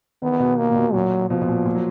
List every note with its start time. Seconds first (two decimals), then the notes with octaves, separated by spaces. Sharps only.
0.22 D#3 B3
0.40 B2
0.58 A#3
0.70 A#2
0.76 B2
0.94 A#2 F#3
1.30 B2 F3
1.41 B2
1.48 A#2
1.66 A#2
1.75 F#3